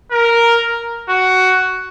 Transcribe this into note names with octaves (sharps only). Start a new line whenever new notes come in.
A#4
F#4